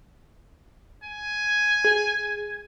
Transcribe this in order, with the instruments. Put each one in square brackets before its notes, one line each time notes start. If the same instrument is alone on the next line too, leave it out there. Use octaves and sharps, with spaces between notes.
[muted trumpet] G#5
[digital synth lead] G#4